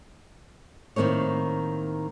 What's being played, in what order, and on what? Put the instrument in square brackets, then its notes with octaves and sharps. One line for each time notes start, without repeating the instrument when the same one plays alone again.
[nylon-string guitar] A2 D#3 F#3 A#3 C4 C#5